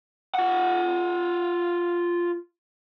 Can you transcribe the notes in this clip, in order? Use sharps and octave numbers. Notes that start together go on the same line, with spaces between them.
F4 F#5